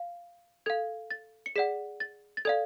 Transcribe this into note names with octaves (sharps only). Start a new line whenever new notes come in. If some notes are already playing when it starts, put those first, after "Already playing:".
Already playing: F5
A4 F5 G#6
A6
C#7
G#4 D5 F#5 B6
A6
A6
A4 D5 F5 G#6